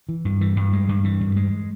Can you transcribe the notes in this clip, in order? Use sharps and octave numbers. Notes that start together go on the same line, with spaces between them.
E3
G2
E3
G2
G#3
G2
E3
G2
G#3